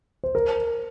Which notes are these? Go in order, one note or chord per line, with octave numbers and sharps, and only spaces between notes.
C5
A#4